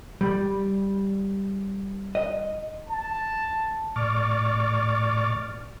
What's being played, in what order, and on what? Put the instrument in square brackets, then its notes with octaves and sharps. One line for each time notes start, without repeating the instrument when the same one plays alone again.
[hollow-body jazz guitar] G3
D#5
[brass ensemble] A5
[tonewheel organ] A2 D5 C#6 D6 F6 A6